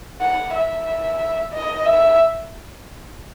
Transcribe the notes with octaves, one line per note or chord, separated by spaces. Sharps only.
F#5
E5
D#5
E5